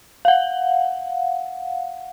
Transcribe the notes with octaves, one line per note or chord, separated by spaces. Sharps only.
F5 F#5